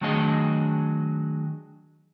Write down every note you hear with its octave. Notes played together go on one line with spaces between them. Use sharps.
D#3 F#3 A3 D4 G#4 D#5